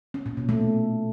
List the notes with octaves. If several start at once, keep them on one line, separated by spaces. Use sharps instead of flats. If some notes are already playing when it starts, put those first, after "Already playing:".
C#4
A#2
B2
A3